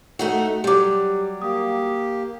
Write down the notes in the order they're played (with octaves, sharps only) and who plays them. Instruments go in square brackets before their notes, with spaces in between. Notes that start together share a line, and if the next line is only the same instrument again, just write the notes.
[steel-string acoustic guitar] A3 D#4 F#4
[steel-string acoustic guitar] F#3 G3 [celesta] G4 D6
[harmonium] A#3 G4 [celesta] D#6